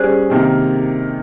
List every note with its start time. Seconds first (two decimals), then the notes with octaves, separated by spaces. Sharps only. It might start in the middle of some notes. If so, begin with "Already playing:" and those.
Already playing: G3 C#4 G#4 C5
0.30 C3 D#3 A#3